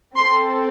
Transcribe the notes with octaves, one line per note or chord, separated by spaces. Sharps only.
C4 A4 C6